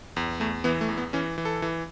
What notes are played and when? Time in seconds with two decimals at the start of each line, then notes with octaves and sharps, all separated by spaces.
0.17 E2
0.40 E2 A3
0.64 E3 B3
0.81 A3
0.89 E2
0.98 B3
1.13 E3 C#4
1.38 E3
1.45 A4
1.62 E3